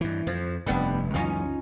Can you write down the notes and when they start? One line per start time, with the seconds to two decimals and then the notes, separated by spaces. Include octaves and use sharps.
0.01 G2 E3
0.27 F2 F3
0.66 F1 G2 G3 B3 D4
1.14 C#2 F#2 E3 C#4 D#4 F4